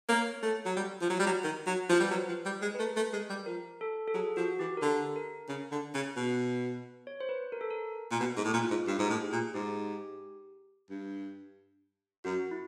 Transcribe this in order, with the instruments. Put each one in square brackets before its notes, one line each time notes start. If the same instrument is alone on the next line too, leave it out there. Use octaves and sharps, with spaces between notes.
[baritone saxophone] A#3 [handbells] C#5
[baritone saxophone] A3
F#3
G3
F3
F#3
G3
F#3
D#3
F#3
F3
[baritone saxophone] G3 [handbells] B4
[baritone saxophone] F#3 [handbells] C5
[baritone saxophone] F3
G3
G#3
[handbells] B4
[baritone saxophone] A3 [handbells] A#4
[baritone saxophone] A3
G#3
G3
[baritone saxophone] F3 [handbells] A#4
[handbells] A4
A4
[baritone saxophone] F#3 [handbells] G#4
[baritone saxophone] F3 [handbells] F#4
[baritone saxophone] E3 [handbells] G4
[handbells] A#4
[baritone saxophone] D3 [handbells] A4
[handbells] A#4
[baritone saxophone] C#3
D3
C#3
B2
[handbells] C#5
C5
B4
A#4
A4
A#4
[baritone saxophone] A#2
B2
G#2
A2
A#2
[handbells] F4
[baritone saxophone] G#2
[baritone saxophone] G2 [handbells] G4
[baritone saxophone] G#2
A2
[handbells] G#4
[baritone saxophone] A#2
[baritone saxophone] G#2 [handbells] G4
[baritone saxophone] G2
[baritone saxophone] F#2 [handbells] F#4
[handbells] E4